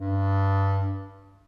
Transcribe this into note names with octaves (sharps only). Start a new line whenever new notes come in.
G2